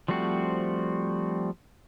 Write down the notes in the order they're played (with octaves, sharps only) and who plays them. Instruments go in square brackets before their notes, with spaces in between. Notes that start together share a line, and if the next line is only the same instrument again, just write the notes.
[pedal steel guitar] F3 G3 A3 C4 F#4